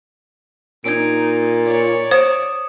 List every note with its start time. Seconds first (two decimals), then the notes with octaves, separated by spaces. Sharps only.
0.84 A#2 D#4 G#6 D7
1.65 C#5 D5
2.11 C5 D#6 E7